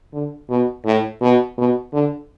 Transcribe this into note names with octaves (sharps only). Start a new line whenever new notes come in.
D3
B2
A2
B2
B2
D3